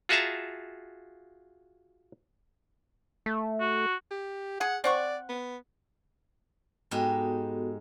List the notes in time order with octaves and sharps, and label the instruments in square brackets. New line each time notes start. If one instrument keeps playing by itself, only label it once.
[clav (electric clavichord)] F4 F#4 G#4 E5 A5 A#5
[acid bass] A3
[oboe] F#4
[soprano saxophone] G4
[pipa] G#4 [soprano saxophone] F#5
[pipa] C4 F#5 C#6 [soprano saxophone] D5
[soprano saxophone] B3
[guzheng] G#2 G4 D#5 [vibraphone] B3 F#4 A4